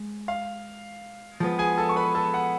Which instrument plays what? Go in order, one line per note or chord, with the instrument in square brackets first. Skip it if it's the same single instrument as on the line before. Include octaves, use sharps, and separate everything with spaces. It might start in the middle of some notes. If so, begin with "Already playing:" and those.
Already playing: [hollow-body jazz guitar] G#3
[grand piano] F5
[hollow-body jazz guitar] F3 G#3 B3
[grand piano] G#4 G#5
A4 A5
C#6
B4 B5
A4 A5
F#5